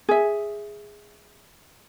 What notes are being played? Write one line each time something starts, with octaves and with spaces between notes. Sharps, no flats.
G#4 E5